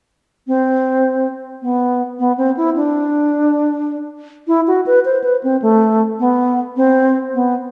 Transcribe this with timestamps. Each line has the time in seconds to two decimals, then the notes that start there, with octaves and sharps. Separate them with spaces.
0.47 C4
1.62 B3
2.19 B3
2.38 C4
2.57 E4
2.76 D4
4.47 E4
4.67 F#4
4.86 B4
5.05 C5
5.24 B4
5.43 C4
5.62 A3
6.20 B3
6.77 C4
7.34 B3